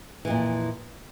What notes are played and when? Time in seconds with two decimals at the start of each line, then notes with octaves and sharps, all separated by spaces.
0.25 E3
0.28 F2
0.30 A#2